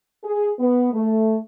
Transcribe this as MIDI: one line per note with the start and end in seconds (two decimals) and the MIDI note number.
0.24 0.50 68
0.59 0.90 59
0.93 1.37 57